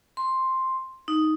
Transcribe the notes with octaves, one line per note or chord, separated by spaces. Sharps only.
C6
D#4